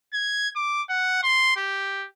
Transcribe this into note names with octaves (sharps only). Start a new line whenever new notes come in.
G#6
D6
F#5
C6
G4